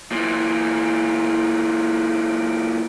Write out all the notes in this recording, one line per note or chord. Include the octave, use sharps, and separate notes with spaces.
A#2 E3